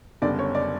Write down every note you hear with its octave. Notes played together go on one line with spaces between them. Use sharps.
F#1 F#2 D3 G3 B3 D5
C#5
D5